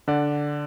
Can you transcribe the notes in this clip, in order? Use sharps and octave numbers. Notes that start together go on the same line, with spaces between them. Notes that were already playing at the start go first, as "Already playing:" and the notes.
D3 D5 F#5